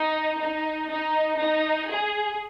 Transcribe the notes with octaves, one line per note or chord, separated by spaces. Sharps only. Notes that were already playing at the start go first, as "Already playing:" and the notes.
Already playing: D#4
D#4
D#4
D#4
G#4